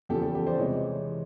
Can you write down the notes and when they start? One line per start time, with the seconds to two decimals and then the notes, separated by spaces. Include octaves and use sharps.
0.09 E2 C#3 F3 G4 A4
0.22 G4 A4
0.34 G4 A4
0.47 C5 D5
0.58 C3 E3 G#3 C#5 D#5